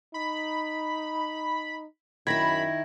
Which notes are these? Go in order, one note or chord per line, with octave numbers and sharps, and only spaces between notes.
D#4 B5
F#2 D#3 E4 B5 G#6 A#6